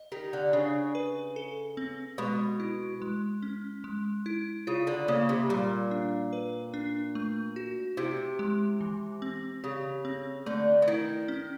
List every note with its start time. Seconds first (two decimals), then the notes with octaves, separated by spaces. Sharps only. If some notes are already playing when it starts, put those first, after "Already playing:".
Already playing: D#5
0.12 D#3 G4
0.33 D3
0.53 C#3 D4
0.95 B4
1.36 A4
1.77 C4
2.18 B2 G#3
2.60 E4
3.02 G#3
3.42 C#4
3.84 G#3
4.26 E4
4.67 C#3 F4
4.87 D3
5.08 C#3 A#3
5.29 C3
5.49 A#2 G3
5.91 D4
6.33 B4
6.74 D4
7.15 A3
7.56 F#4
7.97 C3 E4
8.39 G#3
8.81 E3
9.22 C4
9.64 C#3 G4
10.05 C4
10.46 D3 A3
10.82 E3
10.88 D#3 E4
11.28 C#4